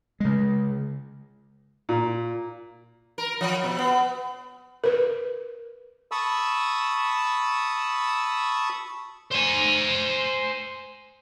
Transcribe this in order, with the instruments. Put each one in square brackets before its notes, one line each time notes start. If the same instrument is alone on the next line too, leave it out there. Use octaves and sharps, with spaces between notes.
[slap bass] C#3 G#3
[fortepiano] A#2
[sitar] A#4
F3
B2
B3
[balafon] A#4 B4
[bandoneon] A5 B5 C#6 D#6 E6
[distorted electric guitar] C5 G#5